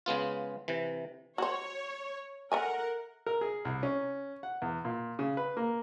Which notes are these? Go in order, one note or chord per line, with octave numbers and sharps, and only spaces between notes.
C#3 G#3 B3 F4
C3 E3
F#4 C5 C#5
A4 A#4 E5 F#5 G#5
A#4
G#4
C2
C#4
F#5
E2
A#2
C#3
B4
A#3